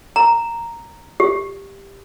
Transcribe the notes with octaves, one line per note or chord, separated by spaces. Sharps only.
A#5
G4